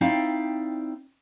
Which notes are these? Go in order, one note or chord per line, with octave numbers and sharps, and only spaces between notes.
C4 D#4 E4 D5 F5 G5